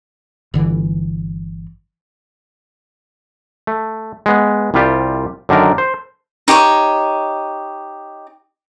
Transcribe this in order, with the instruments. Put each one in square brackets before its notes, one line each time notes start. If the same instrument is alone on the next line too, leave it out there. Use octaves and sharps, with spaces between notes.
[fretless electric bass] G1 D3 E3
[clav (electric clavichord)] A3
G#3 B3
C2 C3 G3 F4 G4
F#2 D3 D#3 D4 A#4
C5
[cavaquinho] D#4 G4 C5 C#5